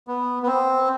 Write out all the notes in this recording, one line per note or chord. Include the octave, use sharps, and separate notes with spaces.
B3
B3
C4